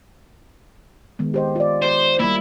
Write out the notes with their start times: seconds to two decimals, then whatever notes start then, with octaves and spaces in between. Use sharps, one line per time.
1.19 D#3 G#3 B3
1.34 G4 C5 D#5
1.56 F4 D5
1.82 C5
2.20 G3 A#3 E4